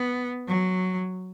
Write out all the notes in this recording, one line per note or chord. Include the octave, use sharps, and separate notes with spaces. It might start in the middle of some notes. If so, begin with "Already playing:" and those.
Already playing: B3
F#3